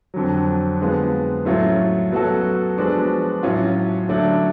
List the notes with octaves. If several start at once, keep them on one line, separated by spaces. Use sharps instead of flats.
F2 D3 F#3
D3 G#3 B3 F4
A2 F#3 A3 C#4 F4
F#3 B3 F#4 A4
F3 G#3 B3 D4 F#4
A2 F#3 C#4 F4
D3 F#3 A3 D4